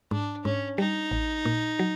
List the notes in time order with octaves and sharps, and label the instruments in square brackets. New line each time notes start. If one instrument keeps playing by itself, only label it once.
[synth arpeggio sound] G#2 [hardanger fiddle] D4
[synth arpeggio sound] G#2 [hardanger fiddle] C#4
[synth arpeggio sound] G3 [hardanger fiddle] D#4
[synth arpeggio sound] A1
A#2
F#3